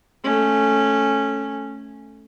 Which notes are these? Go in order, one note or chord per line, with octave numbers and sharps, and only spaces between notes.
A3 C#4